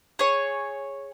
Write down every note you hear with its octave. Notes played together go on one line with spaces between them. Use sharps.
G#4 C#5